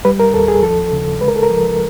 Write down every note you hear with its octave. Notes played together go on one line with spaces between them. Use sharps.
G3 B4
A#4
D#2 A4
G#4
F3 A4
C#3
G#3 B4
A#4
A4
A#4
F3